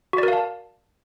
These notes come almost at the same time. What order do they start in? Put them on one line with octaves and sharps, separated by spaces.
F#4 D5 A#4 F5 A5